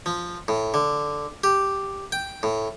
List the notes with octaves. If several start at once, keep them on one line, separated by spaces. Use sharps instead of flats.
F3
A2
D3
G4
G5
A2